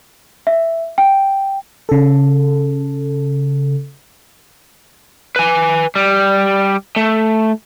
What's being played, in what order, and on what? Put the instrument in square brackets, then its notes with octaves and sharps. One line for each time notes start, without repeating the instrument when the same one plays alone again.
[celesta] E5
G5
[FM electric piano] C#3 A4
[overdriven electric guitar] B4 G#5
G3
A3